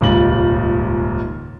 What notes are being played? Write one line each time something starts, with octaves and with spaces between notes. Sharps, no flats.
D#1 C#2 G#2 F#7